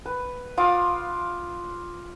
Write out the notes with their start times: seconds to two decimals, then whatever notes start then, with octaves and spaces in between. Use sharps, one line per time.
0.06 B4
0.57 F4 F5 D6 D#6